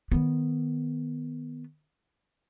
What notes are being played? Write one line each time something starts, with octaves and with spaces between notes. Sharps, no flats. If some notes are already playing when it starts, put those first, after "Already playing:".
D#3 B3